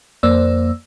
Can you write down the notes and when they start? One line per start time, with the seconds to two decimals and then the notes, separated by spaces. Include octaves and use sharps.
0.23 F2 A#3 C5 D5 E6